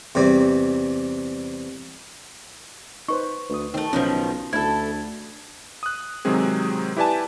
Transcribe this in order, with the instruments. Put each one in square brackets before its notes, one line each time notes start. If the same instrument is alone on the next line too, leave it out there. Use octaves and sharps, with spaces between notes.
[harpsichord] E2 C3 G3
[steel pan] D#4 B4 C5 [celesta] C#6
[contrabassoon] D2 [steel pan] B4 D#6
[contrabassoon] D#3 [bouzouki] A3 C4
[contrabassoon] B1 [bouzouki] B2 D#3 F3 [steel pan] C#4 B4
[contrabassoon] D2 [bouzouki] E4 A4 [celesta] G#6
[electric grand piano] D#6 F#6
C3 D#3 F#3 G#3 C4 G#4
E4 G4 B4 D5 G#5 A5